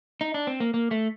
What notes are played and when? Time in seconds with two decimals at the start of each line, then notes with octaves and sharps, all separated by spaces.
0.21 D#4
0.34 D4
0.47 C4
0.60 A#3
0.74 A#3
0.91 A3